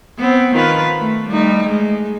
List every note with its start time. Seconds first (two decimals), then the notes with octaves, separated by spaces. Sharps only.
0.19 B3 C4
0.55 D#3 F4 B4
1.00 A3
1.28 G3 A3 D#4
1.69 G#3